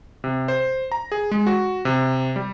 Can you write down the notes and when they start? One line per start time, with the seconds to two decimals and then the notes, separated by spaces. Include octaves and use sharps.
0.24 C3
0.48 C5
0.92 A#5
1.12 G#4
1.31 G#3
1.46 F#4
1.85 C3
2.36 G3